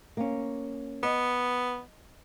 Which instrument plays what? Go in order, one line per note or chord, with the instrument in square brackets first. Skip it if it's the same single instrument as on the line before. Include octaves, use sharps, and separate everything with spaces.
[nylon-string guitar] A#3 C#4
[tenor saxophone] B3 [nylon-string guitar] D#5